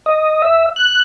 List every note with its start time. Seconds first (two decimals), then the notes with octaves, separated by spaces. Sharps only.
0.06 D#5
0.42 E5
0.76 F#6